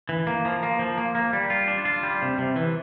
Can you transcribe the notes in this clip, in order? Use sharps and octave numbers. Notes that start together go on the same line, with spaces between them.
E3
A#3
F3
A#3
F3
A#3
A#3
G3
F4
D4
F4
G3
C3
C3
E3